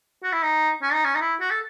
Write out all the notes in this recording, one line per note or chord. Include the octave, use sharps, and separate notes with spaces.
F#4
E4
D#4
C#4
D#4
C#4
D#4
E4
F#4
A4